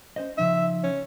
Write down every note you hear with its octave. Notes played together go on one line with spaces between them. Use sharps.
C#4 C5 D#5
C#3 F3 D#4 E5
C#4